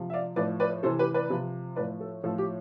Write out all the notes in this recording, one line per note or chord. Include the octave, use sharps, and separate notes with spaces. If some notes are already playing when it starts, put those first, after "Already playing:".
Already playing: C3 F3
E5
D5 F5
A2 F3 B4 D5
B4 D5
C3 E3 A4 C5
G4 B4
B4 D5
C3 F3
A2 F3 B4 D5
A4
A2 F3 A4
G4